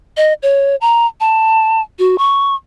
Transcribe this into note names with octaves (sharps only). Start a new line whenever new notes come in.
D#5
C#5
A#5
A5
F#4
C#6